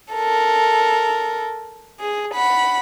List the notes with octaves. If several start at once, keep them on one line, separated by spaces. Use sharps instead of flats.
A4 A#4
G#4
F#5 B5